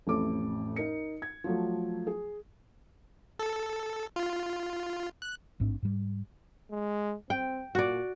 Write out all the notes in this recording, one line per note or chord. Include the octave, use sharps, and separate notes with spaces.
A1 F2 A2 A3 A4 D6
D#4 A#4 C#7
G#6
F3 F#3 A3
G#4
A4
F4
F#6
A1 G#2 C4 D4
G#2 G3
G#3
C4 G5
A#2 F#4 D5